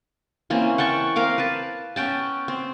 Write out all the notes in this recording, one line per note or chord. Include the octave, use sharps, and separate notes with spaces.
E3 A#3 C4 C#4
F#5 G5 A5 C#6
C4 A#4 F5 D6
B4 A5
B3 C#4 G5 A5
C4